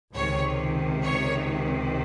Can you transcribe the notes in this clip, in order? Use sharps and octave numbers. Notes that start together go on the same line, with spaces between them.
C#2 C3 D#3 C#5
C#5